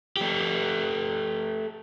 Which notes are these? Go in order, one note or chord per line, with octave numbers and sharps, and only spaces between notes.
A3 G4